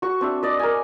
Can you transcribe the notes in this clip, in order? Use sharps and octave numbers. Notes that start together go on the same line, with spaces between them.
F#4 C#6
C4 D4 E5
D5 D#5
A#4 G#5